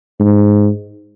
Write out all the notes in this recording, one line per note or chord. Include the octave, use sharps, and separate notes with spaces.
G#2